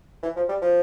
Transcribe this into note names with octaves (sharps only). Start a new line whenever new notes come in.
E3
F3
G3
F3